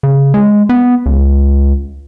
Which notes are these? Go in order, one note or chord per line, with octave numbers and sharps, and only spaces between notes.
C#3
G#3
B3
C#2